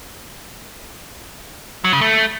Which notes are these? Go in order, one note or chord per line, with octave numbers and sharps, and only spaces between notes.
F#3
C#3
A3